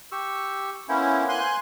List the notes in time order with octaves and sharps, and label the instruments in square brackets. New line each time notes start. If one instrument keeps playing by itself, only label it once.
[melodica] G4 C#6 E6
[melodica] A#3 B3 C5 [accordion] C#4 E4
[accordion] G#5 C6 F#6